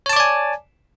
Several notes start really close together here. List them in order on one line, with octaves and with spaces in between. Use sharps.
C#5 A5 D6 D5 G#5